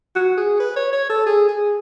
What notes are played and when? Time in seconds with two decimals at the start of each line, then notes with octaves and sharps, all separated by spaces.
0.15 F#4
0.37 G#4
0.60 B4
0.76 C#5
0.93 C#5
1.09 A4
1.26 G#4
1.48 G#4